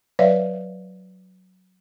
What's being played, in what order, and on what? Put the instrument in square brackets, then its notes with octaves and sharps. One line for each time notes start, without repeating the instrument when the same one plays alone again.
[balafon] F#3 B4 C#5 D5 E5 F5